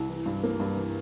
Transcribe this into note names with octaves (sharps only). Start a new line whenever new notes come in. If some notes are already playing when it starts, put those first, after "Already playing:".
Already playing: C2
E3
G2
A#3
G2
E3